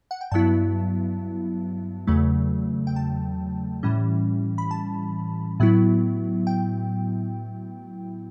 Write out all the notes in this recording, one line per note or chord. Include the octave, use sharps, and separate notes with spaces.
F#5
G5
G2 F#3 B3 E4 A5
E2 C#3 F#3 A3
G5
A5
A2 E3 G3 C#4
B5
A5
A2 F#3 B3 E4
G5